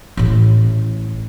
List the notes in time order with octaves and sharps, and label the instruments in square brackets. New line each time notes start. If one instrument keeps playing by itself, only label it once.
[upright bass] A1 A2